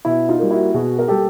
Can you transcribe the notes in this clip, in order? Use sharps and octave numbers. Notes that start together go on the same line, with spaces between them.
B2 E4
D#4 F4
G3 A#3
E4 F#4
B2 F#4 G#4
A#4
G3 A#3 G4 A4